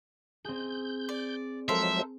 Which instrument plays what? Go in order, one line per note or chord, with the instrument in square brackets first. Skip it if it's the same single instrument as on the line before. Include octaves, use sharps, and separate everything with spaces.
[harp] C4 G#4 [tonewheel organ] G6
[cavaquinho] D5
[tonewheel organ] F3 F#3 G#3 [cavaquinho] A4 A#4 C5 [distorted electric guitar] E5